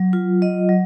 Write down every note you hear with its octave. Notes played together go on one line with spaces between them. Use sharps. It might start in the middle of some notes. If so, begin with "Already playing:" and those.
Already playing: F#3
F4
D#5
F#3